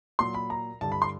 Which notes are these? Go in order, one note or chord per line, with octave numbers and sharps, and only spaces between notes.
A#2 F#3 C6
B5
A#5
G2 D3 G3 A5
B5
C6